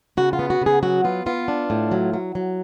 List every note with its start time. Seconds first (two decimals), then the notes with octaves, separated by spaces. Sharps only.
0.17 C#3 F#4
0.33 F4
0.39 B3
0.50 F#4
0.61 C#3 G#4
0.83 F#3 F#4
1.04 B3 F4
1.26 B3 F4
1.48 D4
1.70 A2
1.91 F#3
2.13 F#3
2.35 F#3